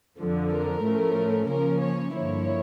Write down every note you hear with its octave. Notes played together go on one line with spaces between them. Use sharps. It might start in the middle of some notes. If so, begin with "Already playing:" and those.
F2 D3 F3
A#4
A2 F3 A3 C#4
C#3 F3 A#3 C#4 A#4
C#5
G2 D3 F3 A#3 E4 C#5